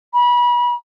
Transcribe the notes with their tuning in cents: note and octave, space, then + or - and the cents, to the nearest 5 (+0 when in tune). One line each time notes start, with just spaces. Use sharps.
B5 -30